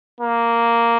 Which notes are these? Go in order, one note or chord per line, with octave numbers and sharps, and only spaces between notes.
A#3